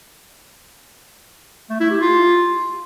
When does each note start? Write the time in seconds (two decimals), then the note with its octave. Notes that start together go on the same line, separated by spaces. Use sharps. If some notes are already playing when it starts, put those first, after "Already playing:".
1.70 A3
1.80 E4
1.90 G4
2.01 F4